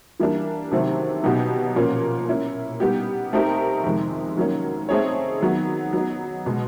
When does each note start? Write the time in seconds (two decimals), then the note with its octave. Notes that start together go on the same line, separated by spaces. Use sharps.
0.20 E3 G3 A#3 D4
0.72 C3 D#3 F#3 A3 C4
1.23 B2 F#3 B3 D#4 G4
1.76 A#2 F3 A#3 C#4
2.29 A#3 C#4 E4
2.80 G3 B3 D#4 G4
3.33 A3 C4 D#4 G4 A#4
3.84 F2 C3 D#3 G#3
4.37 D#3 F#3 A#3 C#4
4.89 A3 C4 D#4 G#4 C#5
5.41 D#3 F#3 B3
5.93 F#3 B3 D#4
6.46 B2 G#3